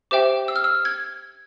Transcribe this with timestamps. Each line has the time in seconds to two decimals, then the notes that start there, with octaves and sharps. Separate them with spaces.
0.11 G4 C5 E5 G5 D6
0.48 E6
0.56 F6
0.64 E6
0.85 G#6